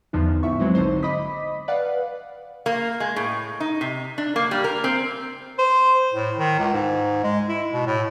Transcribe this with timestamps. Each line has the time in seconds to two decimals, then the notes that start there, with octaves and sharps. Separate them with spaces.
0.13 E2 D3 F3 B3 D#4
0.43 A1 G#2 E4 E5 C#6
0.60 F#3 G#3 C4 F#4 B4 C5
0.75 A#1 D3 D#4 C5
1.02 D#5 B5 D6 D#6 B6
1.68 B4 D5 F5 F#5
2.66 A#3
3.00 G#3
3.16 A2
3.60 D#4
3.81 C3
4.18 D4
4.36 A#3
4.51 G3
4.64 A#4
4.84 C4
5.58 C5
6.14 A2
6.38 D#3
6.59 C#2
6.73 G#2
7.24 G#3
7.48 E4
7.73 B2
7.86 A2